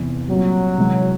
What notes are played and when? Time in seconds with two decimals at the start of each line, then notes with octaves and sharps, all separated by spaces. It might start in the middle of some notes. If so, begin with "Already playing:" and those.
Already playing: E2 C3 E3
0.29 A#2 F#3 G3 C4
0.78 C3 E3 G#3